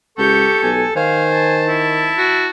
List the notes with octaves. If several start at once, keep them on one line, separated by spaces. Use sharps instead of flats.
C#2 G4 A4 C#6 G6
B1 G#5
D#3 C5 F5 G#5
A5
E4
F#4